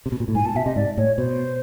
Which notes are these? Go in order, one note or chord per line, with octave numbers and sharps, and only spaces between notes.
C3
B2
A#2
A2
G#2 G#5
A#2 A5
B2 E5
C3 D#5
G#2 D5
A2 C#5
B2 C5